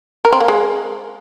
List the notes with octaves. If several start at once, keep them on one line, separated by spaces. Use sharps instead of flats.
A#4
C4
A#3
G#3